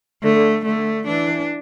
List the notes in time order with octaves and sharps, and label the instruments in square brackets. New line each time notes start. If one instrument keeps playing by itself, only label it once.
[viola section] D3 [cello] A3
[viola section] D3 [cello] A3
[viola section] E3 [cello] D4